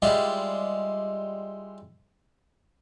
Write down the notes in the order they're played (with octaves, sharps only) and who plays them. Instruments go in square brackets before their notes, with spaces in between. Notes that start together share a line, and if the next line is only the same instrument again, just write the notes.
[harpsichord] G3 G#3 E4 F4 G4